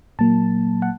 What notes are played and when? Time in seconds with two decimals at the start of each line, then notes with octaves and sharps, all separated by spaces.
0.19 A#2 F#3 A#3 A5
0.82 F#5